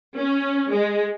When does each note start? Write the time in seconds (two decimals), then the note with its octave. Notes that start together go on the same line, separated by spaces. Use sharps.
0.17 C#4
0.70 G#3